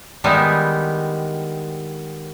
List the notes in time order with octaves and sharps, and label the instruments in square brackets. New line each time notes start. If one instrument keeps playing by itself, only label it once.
[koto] D#3 G3 G#3 B3 D#4 E4